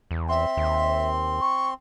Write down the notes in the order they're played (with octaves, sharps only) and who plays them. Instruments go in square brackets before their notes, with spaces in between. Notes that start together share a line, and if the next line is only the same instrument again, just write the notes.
[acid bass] E2
[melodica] C4 C6 [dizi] E5
[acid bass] D#2
[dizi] C#6